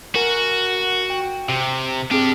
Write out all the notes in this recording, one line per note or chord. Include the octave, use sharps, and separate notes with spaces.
F#4 A#4 G#5
G5
C3
C4 D4 G4 G#4